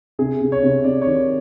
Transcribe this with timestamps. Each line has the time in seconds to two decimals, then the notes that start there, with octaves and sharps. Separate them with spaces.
0.19 C3 G#4
0.41 C3
0.52 C#5
0.63 C3
0.84 C3 D5
1.02 C#5
1.07 D#3